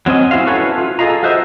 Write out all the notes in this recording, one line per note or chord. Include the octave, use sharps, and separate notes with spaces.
F#3 C4 C#4 D#5
C#4 E4 F#4 C5 F5
C#4 E4 F#4 A4 B4 C#5
F4
G#4 A4 C#5 D#5 F5 A#5
F4 F#4 B4 C5 D#5 E5